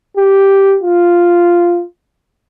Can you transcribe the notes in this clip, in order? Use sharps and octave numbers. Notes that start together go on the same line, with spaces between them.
G4
F4